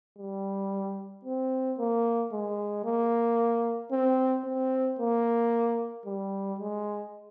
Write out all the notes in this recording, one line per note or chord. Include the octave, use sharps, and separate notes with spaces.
G3
C4
A#3
G#3
A#3
C4
C4
A#3
G3
G#3